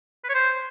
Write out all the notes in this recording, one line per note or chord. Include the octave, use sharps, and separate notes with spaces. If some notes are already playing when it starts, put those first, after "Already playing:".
B4
C#5
C5